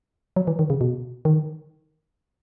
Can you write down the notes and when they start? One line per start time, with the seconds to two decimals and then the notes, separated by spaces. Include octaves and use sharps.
0.36 F#3
0.47 E3
0.59 D#3
0.70 C#3
0.81 B2
1.25 D#3